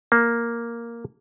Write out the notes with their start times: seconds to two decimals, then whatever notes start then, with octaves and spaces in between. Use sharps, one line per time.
0.12 A#3